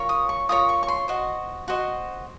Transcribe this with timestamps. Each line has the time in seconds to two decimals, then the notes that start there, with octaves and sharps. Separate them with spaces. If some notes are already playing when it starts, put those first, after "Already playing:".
Already playing: F4 A#4 C#5
0.09 D#6
0.29 C#6
0.49 F4 A#4 C#5 D#6
0.69 C#6
0.83 C#6
0.88 C6
1.08 F#4 C5 D#5
1.68 F#4 C5 D#5